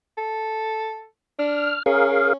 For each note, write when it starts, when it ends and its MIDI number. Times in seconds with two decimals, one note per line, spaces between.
0.18 1.05 69
1.39 1.73 62
1.39 1.83 89
1.86 2.35 61
1.86 2.33 68
1.86 2.33 70
1.86 2.33 77